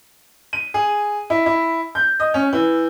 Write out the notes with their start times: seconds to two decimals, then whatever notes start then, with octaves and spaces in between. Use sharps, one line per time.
0.53 D#7
0.74 G#4
1.30 E4
1.46 E4
1.95 G6
2.20 D#5
2.34 C#4
2.53 E3